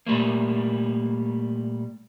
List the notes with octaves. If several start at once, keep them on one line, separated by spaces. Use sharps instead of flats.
A#2 G3 A3 A#3